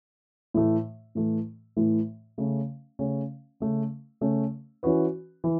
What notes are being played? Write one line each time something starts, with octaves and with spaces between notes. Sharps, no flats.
A2 E3 A3
A2 E3 A3
A2 E3 A3
C#3 A3 C#4
C#3 A3 C#4
C#3 A3 C#4
C#3 A3 C#4
E3 C#4 F#4 B4
E3